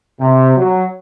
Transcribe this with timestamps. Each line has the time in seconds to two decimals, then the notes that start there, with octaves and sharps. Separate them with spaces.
0.20 C3
0.57 F#3